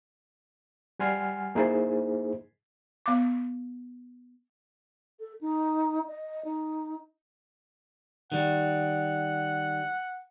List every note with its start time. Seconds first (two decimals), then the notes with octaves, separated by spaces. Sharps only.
0.99 G3 F#5 G#5 C6 F6
1.55 A#3 D#4 E4 G#4 C5
3.06 B3 D6
5.20 A4
5.41 D#4
6.08 D#5
6.45 D#4
8.32 D#3 G3 F#5